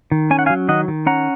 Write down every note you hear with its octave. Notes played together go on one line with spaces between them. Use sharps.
D#3
C#4 G#5
F#5
F5 G#5
F#3
D#3 D#5 F#5
D#3
C#4 F#5 A#5